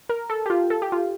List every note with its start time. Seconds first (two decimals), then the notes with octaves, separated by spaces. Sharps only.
0.09 A#4
0.30 A4
0.46 G4
0.50 F4
0.70 A4
0.82 G4
0.92 F4